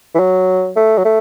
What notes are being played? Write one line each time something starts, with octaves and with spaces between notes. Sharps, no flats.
E3
F#3
A3
F#3
A3